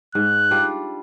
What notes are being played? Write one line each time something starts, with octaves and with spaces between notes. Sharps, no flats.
G#2 F#6
G3 D4 F4